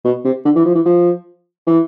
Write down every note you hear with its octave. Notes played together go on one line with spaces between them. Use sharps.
B2
C3
D3
E3
F3
E3
F3
E3